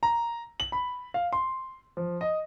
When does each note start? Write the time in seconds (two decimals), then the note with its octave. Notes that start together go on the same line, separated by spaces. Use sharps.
0.03 A#5
0.60 F#7
0.72 B5
1.14 F5
1.33 C6
1.97 F3
2.21 D#5